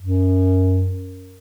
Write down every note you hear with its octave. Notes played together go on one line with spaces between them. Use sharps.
F#2